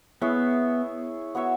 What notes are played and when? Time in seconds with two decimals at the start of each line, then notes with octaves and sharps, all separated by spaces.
0.22 B3 E4 G#4 C#5 E5
1.35 B3 F#4 C#5 E5